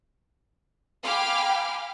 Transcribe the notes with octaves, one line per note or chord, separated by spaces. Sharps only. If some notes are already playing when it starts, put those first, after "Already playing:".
F5 G5 G#5 B5 D6 F6